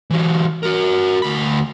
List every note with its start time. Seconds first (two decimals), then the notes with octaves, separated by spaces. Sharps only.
0.10 E3 F#3
0.63 F#4 A#4
1.22 D2 B5